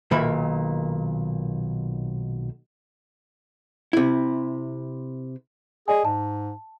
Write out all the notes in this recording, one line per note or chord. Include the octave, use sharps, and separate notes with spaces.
B1 A#2 D#3 E5 B5
C3 E4
G#4 D5 D#5 G#5
G#2 A5